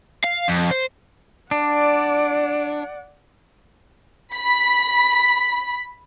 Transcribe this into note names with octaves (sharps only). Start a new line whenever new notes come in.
F5
F2
C5
D4 D5 F#5
B5 B6